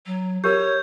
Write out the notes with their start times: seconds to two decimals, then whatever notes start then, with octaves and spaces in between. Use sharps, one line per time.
0.06 F#3
0.44 G4 A#4 C#5 G6